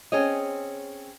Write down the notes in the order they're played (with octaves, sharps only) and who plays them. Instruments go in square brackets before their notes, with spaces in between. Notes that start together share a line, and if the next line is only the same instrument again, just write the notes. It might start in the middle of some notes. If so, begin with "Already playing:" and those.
[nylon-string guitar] C4 C#4 G#4 C#5 D#5